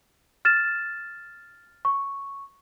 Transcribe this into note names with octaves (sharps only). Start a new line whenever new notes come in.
F6 A6 E7
C#6